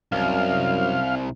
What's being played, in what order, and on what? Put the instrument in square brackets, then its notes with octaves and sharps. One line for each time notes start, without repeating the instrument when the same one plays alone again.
[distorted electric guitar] C2 [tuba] F#2 [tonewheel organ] F5